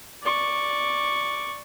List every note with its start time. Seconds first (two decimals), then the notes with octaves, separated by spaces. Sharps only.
0.23 D5 C#6